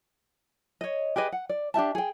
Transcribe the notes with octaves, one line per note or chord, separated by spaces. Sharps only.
C#5 D#5
G4 G#4 B4 D#5
F#5
D5
D4 G4 E5 A5
G#4 G5